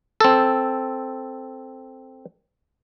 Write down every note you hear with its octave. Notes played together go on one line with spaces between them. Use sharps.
C4 A4